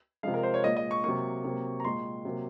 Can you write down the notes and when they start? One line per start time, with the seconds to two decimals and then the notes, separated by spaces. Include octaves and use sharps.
0.23 C3 F3 G#3 F5
0.34 A#4
0.43 C5
0.54 C#5
0.64 A#2 G#3 D#5
0.77 D#5
0.91 C#6
1.04 C3 F#3 A#3 C#6
1.44 C3 F#3 A#3
1.80 A#5
1.85 A#2 G#3 C6
2.25 C3 F#3 A#3